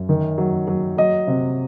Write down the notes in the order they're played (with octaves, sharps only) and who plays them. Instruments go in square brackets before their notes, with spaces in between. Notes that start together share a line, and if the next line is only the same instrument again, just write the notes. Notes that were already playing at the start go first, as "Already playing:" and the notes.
Already playing: [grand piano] F#2
D#3
F#3
F#3
F#3 D#5
C3